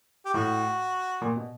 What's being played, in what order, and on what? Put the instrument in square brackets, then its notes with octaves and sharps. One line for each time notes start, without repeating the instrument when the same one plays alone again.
[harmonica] G4
[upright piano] A2 [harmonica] F#4
[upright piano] A#2
B2